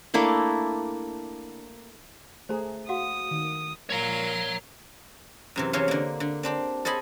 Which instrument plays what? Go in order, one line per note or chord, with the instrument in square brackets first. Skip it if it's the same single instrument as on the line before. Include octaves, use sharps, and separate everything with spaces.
[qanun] A3 A#3 D4 E4
[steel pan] A3 G#4 [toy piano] C5 A#5
[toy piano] F#4 F5 F#5 [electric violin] D#6
[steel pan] D#3
[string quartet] A#2 A#4 F5 [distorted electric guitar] C#5 A#5
[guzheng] F#2 C3 E3
C3 E3 C#4 C#5 F5 C6
D3 A#3
D3
C4 D4 G4
A4 C5 D#5 G#5 B5